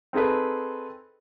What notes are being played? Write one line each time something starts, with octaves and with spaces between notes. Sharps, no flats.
C4 D#4 G#4 A4 B4